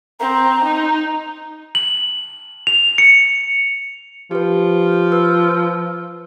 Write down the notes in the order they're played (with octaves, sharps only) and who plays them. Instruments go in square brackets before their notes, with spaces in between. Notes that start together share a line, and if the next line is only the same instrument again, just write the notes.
[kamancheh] C4 [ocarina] A#5
[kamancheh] D#4
[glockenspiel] F#7
F7
C#7
[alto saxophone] F3 [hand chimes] G4 B4
[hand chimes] B4 E6 F6